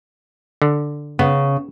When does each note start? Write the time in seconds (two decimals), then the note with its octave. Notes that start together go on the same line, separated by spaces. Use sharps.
0.62 D3
1.19 C#3 B3